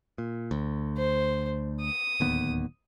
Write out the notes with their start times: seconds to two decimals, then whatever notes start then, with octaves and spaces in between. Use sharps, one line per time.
0.18 A#2
0.51 D2
0.97 C5
1.81 D#6
2.20 D1 D#2 B3